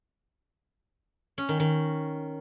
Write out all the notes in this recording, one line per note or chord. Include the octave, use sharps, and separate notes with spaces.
C#4
D#3
D#3